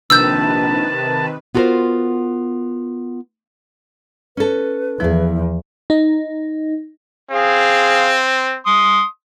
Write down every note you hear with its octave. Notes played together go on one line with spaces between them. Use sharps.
A#1 C3 D#3 B4 A5 E6 G6
B3 F4 F#4 A4 A#4 C5
C#4 A4 B4
E2 F3 E4 G#4
D#4
C4 G#4 F5
C6 D#6